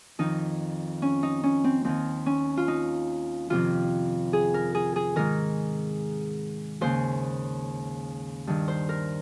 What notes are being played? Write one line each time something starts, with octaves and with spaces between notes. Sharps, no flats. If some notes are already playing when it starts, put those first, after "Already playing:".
F2 D#3 D#4
C#4
D#4
C#4
C4
D#2 D#3 C4
C#4
F4
D#4
F2 C3 D#3 F4
G#4
A#4
G#4
G#4
G#2 D#3 A#4
D#2 C#3 C5
G2 D#3
C5
A#4